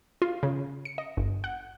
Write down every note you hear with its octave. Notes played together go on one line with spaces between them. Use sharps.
F4
C#3
C#7
D#5
G1
F#5